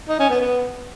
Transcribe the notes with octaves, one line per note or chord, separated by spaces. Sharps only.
D#4
C#4
B3
B3